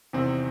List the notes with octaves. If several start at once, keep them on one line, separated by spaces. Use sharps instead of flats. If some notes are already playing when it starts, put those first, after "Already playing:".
E2 C3 D#3 C4